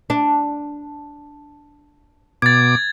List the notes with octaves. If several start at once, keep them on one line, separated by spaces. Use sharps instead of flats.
D4
B2 D6 G#6 A6